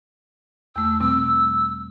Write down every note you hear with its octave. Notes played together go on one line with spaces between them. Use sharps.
E2 A3 E6
B2 G3 C4 E6